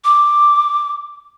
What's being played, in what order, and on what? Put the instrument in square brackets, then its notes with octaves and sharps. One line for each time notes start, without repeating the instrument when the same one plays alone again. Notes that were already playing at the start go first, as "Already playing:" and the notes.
[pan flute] D6